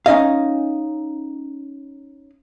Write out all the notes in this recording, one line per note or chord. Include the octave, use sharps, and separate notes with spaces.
C#4 D#4 D#5 F5